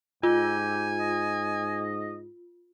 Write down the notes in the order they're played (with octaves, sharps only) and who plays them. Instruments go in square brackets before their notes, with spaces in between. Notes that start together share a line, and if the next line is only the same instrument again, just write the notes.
[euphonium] G#2 [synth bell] F4 [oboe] G4 [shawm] G#5
[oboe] D#5